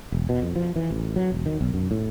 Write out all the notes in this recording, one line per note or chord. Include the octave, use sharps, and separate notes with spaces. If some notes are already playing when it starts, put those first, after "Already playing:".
E1
B2
F2
F3
E3
A1
F#3
E1
D#3
B1
F#2
A2